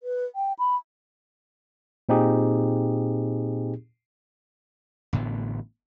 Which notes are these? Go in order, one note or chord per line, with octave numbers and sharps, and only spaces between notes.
B4
G5
B5
A#2 C4 D#4 G4 G#4
A1 A2 D3 B3